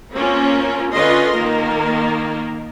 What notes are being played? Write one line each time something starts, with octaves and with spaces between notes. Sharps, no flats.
A#3 C4 C#4 F4 A#4
D3 C#4 F4 B4 D#5 C6
D#3 A#3 A#4